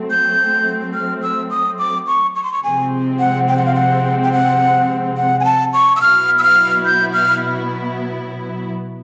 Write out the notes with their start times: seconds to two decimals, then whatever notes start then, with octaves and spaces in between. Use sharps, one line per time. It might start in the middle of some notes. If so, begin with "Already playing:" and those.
Already playing: F#3 A3 C4
0.10 G6
0.94 F6
1.22 E6
1.51 D#6
1.79 D6
2.07 C#6
2.36 C#6
2.44 C6
2.53 C#6
2.64 C3 F3 G#3 C4 G#5
3.19 F#5
3.48 G5
3.57 F#5
3.66 F5
3.75 F#5
4.23 G5
4.32 F#5
5.17 F#5
5.40 G#5
5.45 A5
5.73 C#6
5.96 E6
6.01 B2 F#3 B3 E4 F6
6.39 E6
6.43 F6
6.86 G6
7.14 F6